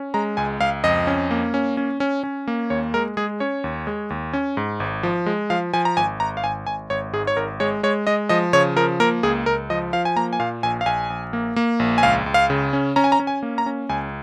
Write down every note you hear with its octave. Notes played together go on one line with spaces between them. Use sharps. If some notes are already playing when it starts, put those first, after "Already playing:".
Already playing: C#4
G#3 A#5
C#2 G#5
C#2 F5
F2 D#5
C#4
A#3
C#4
C#4
C#4
C#4
A#3
D#2 C#5
G#3 A#4
G#3 G#4
C#4 C#5
D#2
G#3
D#2
C#4
G#2
G#1
F3
G#3
F3 F5
F3 G#5
A#5
G#1 G#5
G#1 A#5
F5
G#1 G#5
G#1 G#5
G#1 C#5
G#2 G#4
C#5
G#1 A#4
G#3 C#5
G#3 C#5
G#3 D#5
F3 D#5
C#3 C#5
F3 A#4
A#3 A#4
C#2 G#4
C#2 A#4
F3 D#5
F3 F5
G#5
A#3 A#5
G#5
A#2 F5
A#1 G#5
F5
A#1 G#5
A#1
A#3
A#3
A#1
G#5
C#2 F5
C#2
F5
C#3
C#4
C#4 A#5
G#5
A#5
C#4
G#5
A#3
A#5
C#4
C#2 G#5